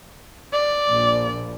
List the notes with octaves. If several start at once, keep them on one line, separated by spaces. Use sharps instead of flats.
D5
A#1